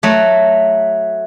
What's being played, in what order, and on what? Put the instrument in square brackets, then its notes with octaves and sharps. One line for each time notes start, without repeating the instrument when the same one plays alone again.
[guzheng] F#3 A3